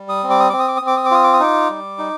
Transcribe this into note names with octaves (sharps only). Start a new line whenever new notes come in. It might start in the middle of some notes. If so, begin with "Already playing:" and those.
Already playing: G3
D#6
C4
D6
D#6
C4 D6
D#6
D6
D#6
C4
D6
D#6
D6
F4 D#6
D6
D#6
D#4 D6
G3
D#4